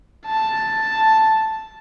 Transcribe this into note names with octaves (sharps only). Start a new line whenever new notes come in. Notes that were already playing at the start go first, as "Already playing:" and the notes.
A5